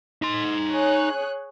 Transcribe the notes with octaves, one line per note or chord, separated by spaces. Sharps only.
D#4 C6
G#4 C#5 F#6